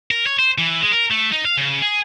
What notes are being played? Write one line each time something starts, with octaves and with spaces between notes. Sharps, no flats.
A#4
C#5
C5
E3
G#3
A#4
A3
D#4
F5
C#3
G#4